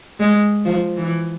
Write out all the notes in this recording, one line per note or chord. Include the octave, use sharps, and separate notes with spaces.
G#3
F3
E3